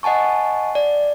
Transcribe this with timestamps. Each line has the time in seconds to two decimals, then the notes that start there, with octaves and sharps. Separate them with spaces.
0.03 D#5 F#5 G#5 A5 C#6
0.75 D5